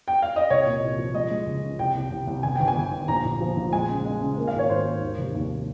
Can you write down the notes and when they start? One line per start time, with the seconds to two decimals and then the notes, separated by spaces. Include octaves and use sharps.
0.08 G5
0.22 F5
0.36 D#5
0.50 C2 C#5
0.66 A#2
0.82 C2
0.98 F3
1.15 G#3 D#5
1.31 G#3
1.47 C#2
1.63 C#3
1.79 C2 G5
1.95 C2
2.11 C2
2.27 C2
2.43 G1 G#5
2.55 G1 G5
2.68 G#5
2.76 G1
2.92 G1
3.08 A#1 A#5
3.24 A#1
3.41 F3
3.57 A#1
3.73 G#3 G#5
3.89 C#3
4.05 G#3
4.21 C#3
4.37 A#3
4.48 F5
4.53 G#1
4.59 C#5
4.70 G#2 C5
4.85 A#3
5.02 D#2
5.18 F1
5.34 D#2